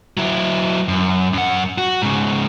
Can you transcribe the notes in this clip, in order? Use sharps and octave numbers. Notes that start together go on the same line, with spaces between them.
F#3 E4
F#2
F#2 F#5
F#4
G#2 C#3